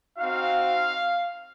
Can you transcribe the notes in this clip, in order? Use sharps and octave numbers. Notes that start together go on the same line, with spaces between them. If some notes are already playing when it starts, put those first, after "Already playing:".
C4 D#4 F#4 F5